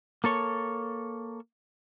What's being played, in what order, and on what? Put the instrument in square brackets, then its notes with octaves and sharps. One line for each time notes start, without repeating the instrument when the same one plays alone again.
[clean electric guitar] A#3 A4 C#5